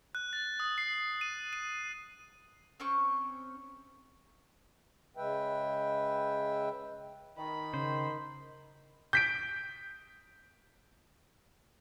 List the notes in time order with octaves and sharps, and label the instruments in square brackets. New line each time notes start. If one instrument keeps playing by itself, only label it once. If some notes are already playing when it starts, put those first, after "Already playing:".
[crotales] F#6
A6
D#6
C7
D#7
D#7
[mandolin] C4 C#4 C#6
[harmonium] C#3 G#3 B4 E5 G5
[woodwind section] D#3 [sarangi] B5
[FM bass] C#3 [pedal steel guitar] C5
[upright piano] G6 B6 D7